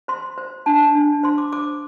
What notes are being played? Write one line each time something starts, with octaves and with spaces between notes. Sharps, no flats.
C5 C6
C5
D4 A5
D4
C5 C6
D6
C5 D6